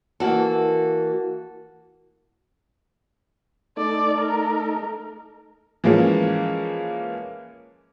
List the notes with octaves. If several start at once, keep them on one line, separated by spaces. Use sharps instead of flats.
E3 A#3 F#4 A4
A3 D#4 A4 D5
A#4
E3 F3 G#3 A#3 C#4